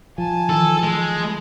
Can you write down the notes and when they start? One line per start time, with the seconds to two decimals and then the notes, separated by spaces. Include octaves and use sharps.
0.18 F3 G#5 A5
0.49 D#3 E3 A4
0.82 G#3